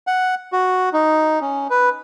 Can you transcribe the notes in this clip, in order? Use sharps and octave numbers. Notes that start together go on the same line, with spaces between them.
F#5
F#4
D#4
C#4
B4